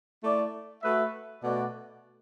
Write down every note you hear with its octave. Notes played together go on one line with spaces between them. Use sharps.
A3 E4 D5
A3 F#4 B4 E5
B2 A3 F#4 D5